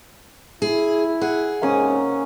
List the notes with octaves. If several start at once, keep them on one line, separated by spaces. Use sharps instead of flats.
E4 G#4
G#4 F#5
G#2 C3 A#3 C#4 D#6